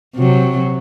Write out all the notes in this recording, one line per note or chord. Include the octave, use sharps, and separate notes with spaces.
C3 F#3